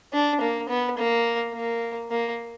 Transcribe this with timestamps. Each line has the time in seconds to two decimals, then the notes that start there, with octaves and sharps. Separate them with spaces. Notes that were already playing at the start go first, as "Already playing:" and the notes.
0.13 D4
0.41 A#3
0.69 B3
0.98 A#3
1.54 A#3
2.11 A#3